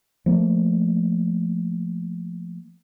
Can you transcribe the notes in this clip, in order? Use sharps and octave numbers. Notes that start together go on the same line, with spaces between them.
F3 A3 A#3